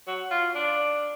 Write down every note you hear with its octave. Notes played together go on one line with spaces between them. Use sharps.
F#3
F4
D4